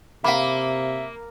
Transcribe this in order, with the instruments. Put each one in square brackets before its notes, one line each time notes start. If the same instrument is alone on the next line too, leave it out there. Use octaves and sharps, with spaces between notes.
[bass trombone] C3 [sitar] A#3 [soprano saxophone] E5 [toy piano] F5 B5